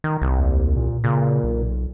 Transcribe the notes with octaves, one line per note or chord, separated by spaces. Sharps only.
D#3
C2
D#2
A#2
A#2 C#3
B1